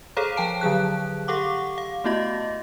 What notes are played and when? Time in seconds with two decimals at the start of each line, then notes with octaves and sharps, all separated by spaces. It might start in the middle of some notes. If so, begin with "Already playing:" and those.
0.17 G#4 A4 C5 C#5 F5 A#5
0.37 F3 G5 A5 D7
0.61 D3 F#3 G#4 F#6
1.28 G4 A4 F5 F#5 C#6 D6
1.78 F5
2.04 A3 B3 E4 F#4 D#5 A#6